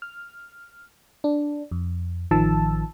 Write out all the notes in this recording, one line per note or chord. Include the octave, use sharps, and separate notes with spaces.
F6
D4
F2
A1 D#3 F3 A5 E6